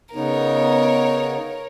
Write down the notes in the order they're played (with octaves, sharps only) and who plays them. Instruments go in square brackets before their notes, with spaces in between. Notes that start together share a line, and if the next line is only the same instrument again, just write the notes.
[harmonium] C#3 B3 D#4 [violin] A#4 C#5